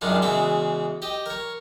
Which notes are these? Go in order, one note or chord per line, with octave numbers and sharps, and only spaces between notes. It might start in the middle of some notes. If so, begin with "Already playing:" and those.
F#2 D#3 G3 G#3 D4 F4
E2 C#3 E3 G#3 F#4 E5
G4 D#5
A#4 C#5